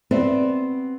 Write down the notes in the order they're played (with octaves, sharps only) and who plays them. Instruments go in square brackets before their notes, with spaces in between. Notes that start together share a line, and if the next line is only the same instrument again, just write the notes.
[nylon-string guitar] B3 C4 G4 C5 D5 E5